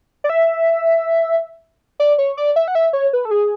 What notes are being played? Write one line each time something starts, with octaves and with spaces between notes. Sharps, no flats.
D5
E5
D5
C#5
D5
E5
F#5
E5
C#5
B4
A4
G#4